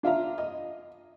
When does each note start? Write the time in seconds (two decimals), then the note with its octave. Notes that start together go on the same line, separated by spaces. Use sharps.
0.03 D4 F4 E5 A#5
0.38 D#5